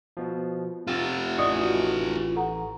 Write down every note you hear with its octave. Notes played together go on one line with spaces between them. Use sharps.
B2 F3
C3 F4 G4 E6 A6
A1 E3 D5 D#5 C#6 D#6
F#4
A4 F#5 A#5